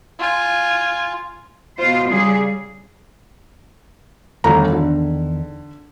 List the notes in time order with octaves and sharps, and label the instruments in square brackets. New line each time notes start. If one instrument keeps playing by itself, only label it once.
[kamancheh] F4 G#5
[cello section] B2 F4 C5
C#3 G3 G#4
[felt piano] G1 A3 A#5 [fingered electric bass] E2 D#3
[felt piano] D3